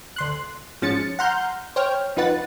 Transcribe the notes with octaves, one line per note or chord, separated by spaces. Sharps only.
D2 C6 F#6
G#1 F3 G#3 C#4 A6 C#7
F#5 A#5 C6 F6 G6
C5 C#5 G5 F6
F2 D#4 F4 B4 F#5 A6